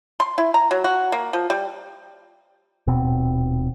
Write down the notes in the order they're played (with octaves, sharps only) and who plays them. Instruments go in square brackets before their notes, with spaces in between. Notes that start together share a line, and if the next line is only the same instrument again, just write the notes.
[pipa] C6
E4
A#5
F#3
F#4
A#3
F3
G3
[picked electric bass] D#1 B2 C4